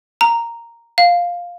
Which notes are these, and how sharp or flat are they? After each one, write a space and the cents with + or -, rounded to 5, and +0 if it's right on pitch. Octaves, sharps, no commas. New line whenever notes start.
A#5 -5
F5 +5